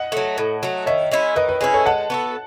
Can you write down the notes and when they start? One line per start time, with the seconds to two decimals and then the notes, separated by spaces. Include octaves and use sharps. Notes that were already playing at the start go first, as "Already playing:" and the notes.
Already playing: D#5 F#5
0.12 F#3 A3
0.38 A2
0.63 F#3 A3
0.86 D#3 C#5 E5
1.12 G#3 C#4 E4
1.36 D#3 B4 D#5
1.49 B4
1.60 G#3 C#4 E4 B4
1.74 A4 C#5
1.86 G#3 F#5 A5
2.10 B3 F#4 A4